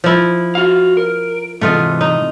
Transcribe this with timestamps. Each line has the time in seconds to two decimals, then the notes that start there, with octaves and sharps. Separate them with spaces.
0.04 F3 E4
0.55 F#4 F5
0.97 A#4
1.61 G#2 C3 E3 A3 F4 D#5
2.01 D#4